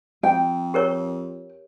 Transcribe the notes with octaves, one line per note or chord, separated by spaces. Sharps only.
F2 G5
G4 A#4 C#5